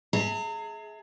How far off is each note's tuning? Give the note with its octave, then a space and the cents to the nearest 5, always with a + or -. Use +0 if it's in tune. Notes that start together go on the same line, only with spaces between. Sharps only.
G#4 +20 E5 -30 A#5 -40